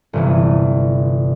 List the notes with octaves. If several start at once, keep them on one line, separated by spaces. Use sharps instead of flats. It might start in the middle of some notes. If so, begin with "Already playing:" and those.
G1 C3 E3